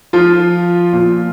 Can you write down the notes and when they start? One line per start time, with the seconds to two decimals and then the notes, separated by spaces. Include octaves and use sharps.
0.13 F3 F4
0.93 A#2 F3